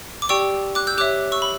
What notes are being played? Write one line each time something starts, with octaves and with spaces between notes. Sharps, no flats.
D6
G4 D5 G5 C#6 E6
D6 F#6
E6 G6
G4 C#5 E5 D6 F#6
C#6 E6
B5